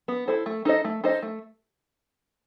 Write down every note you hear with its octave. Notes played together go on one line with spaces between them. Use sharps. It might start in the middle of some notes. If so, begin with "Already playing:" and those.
B3
E4 A4 C5
A3
D#4 A4 C5 D#5
A3
D#4 A4 C5 D#5
A3